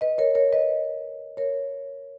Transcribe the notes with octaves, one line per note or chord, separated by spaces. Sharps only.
B4 D#5
A#4 C#5
A#4 C#5
B4 D#5
A#4 C#5